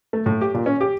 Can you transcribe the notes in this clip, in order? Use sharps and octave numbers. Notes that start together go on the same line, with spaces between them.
A3
A2
G4
A#2
C#4
G4